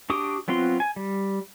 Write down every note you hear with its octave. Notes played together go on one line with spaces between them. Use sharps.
D4 F#4 G4 D6 D#6
F#3 B3 C4 F4 C6
G#5
G3